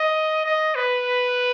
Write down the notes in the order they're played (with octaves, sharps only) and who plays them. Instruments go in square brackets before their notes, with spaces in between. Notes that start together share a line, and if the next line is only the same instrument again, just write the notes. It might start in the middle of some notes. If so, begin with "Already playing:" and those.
Already playing: [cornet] D#5
D#5
B4